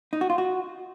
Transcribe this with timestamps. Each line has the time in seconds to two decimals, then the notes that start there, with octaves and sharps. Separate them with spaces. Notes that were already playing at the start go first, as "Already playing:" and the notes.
0.13 D#4
0.21 F#4
0.30 F4
0.38 F#4